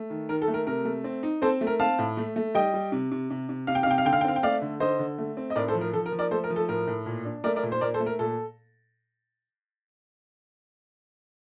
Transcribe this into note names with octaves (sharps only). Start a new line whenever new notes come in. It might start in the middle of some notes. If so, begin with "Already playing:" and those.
Already playing: A3
D#3
D#3 A#4
A4
A3
A#4
C3 A#4
A3
C4
D#4
C4 A4 C5
A3
A#4
C4 F5 A5
A2
A3
A3
G3 D#5 G5
G3
C3
C3
C3
C3
C3 F5
G5
F5
C3 G5
F5
D3 G5
F5
G5
C4 F5
G5
A3 D5 F5
D3
D3 C5 D#5
D3
A3
C4
D#5
A2 A#4 D5
A4 C5
F3
A#4
F3 A4
A#4
F3
A#4 D5
A3 A4 C5
A#4
F3
A4
A2 A#4
A2
A#2
D4
A3 A#4 D5
A#4 D5
A#2
C5
A#2 A#4 D5
A4 C5
A3
A#4
A#2 A4